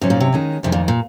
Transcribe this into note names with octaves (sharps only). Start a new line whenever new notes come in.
G#2 C3 F#3 C#4
A#2
C3
D#3 G#3 C#4
F2 C3 D#3 G#3
A#2
A#2